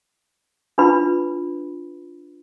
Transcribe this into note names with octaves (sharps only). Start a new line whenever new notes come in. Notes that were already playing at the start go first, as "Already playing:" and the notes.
D4 E4 F4 B4 B5